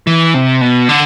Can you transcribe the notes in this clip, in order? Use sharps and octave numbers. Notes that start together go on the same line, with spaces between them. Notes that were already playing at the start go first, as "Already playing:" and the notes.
E3
C3
B2
D3